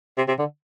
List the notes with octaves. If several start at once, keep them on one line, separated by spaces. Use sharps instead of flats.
C3
C3
D3